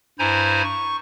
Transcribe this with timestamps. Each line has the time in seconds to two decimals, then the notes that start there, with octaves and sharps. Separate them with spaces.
0.19 G2 E4 C5 G#5 A#5 G#6
0.63 C#6